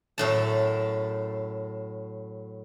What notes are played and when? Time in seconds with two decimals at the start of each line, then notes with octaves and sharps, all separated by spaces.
0.18 F#2 A2 A5